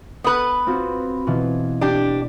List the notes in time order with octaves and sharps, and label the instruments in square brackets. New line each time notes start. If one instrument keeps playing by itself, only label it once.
[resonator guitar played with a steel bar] B3 B4 [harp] F#5
[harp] C4 F4 F#4
B2 E3 F4
[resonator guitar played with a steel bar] D4 G4